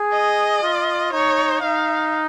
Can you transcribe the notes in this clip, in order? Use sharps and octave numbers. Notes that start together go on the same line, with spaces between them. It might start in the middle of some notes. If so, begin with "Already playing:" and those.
Already playing: G#4
D#5
F4
D#4 C#5
D#4 F5